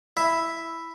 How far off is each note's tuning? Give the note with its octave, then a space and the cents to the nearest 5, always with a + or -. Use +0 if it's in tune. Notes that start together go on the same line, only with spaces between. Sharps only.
E4 +0 E5 +0